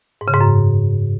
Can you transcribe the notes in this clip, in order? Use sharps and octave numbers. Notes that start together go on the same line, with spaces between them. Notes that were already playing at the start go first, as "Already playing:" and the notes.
G#2
C#3
G#2
F#2